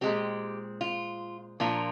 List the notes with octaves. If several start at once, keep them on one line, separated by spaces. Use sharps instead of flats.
A#2 G#3 C4 G4
F4
A#2 F3 A#3 D4 F4